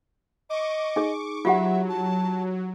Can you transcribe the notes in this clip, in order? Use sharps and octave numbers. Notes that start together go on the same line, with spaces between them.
D#5 C#6 D6
D#4 G#4
F#3 F4 G4 E5 F#5
A5